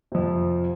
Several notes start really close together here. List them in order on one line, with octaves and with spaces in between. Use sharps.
C3 F3 F2